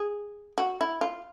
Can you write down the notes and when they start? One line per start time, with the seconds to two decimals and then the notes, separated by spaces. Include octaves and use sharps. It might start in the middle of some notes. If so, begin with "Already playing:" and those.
Already playing: G#4
0.58 F#4
0.81 E4
1.01 F4